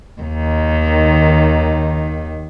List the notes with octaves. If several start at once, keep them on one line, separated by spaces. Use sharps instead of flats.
D#2 D#3